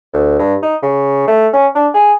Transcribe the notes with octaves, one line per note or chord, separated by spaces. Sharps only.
D2
G2
D#4
C#3
A3
C#4
D4
G#4